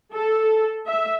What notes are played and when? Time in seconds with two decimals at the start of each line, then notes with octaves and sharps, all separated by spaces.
0.14 A4
0.88 E5